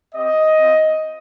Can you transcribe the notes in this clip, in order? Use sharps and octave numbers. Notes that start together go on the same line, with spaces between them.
C4 G4 D#5
C4 F4